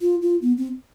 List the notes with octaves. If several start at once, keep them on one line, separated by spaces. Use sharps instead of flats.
F4
F4
B3
C4